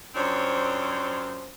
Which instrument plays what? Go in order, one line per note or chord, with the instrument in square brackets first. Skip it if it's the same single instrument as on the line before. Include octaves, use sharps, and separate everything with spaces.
[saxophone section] F#2 F3 C4 D4 C#5